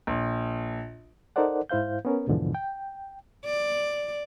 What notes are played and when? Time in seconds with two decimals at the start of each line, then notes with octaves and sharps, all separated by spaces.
0.07 A#1
1.36 D#4 A4 A#4 C5 D5 F#5
1.69 G#2 E4 C5 F5 G6
2.05 B3 C#4 A#4
2.27 D#2 G#2 B2 D3 E3 F3
2.55 G5
3.45 D5